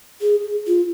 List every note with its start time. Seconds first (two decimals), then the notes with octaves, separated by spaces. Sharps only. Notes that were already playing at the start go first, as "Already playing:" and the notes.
0.21 G#4
0.68 F4